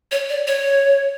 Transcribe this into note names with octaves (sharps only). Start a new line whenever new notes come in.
C#5
D5
C#5